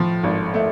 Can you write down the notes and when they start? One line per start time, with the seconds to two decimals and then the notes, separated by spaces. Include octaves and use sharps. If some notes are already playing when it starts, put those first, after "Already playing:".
Already playing: A2 F3
0.23 G#1
0.54 A3